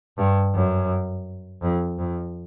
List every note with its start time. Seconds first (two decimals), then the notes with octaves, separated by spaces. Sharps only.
0.18 G2
0.54 F#2
1.62 F2
1.98 F2